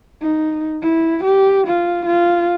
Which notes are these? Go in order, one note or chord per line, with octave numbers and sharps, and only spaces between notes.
D#4
E4
G4
F4
F4